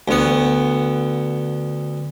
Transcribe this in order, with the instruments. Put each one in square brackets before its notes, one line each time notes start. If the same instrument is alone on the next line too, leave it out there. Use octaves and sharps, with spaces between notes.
[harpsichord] D2 B3